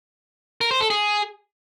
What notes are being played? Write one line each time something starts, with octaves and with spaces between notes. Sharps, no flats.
A#4
C5
A4
G#4